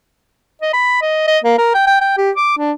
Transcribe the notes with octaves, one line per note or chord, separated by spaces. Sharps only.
D#5
B5
D#5
D#5
A#3
A#4
G5
G5
G5
G4
D6
D4